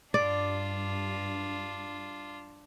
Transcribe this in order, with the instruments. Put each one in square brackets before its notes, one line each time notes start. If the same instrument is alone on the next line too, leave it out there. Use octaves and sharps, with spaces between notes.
[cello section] G2 [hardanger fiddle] D4 F4 [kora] D5